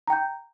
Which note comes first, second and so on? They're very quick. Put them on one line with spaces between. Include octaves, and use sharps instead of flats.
A#5 G5 G6